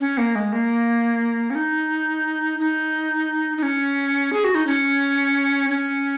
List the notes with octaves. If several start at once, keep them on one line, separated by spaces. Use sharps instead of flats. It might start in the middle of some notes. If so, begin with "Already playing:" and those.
C#4
A#3
G#3
A#3
C#4
D#4
D#4
D#4
C#4
G#4
F#4
D#4
C#4
C#4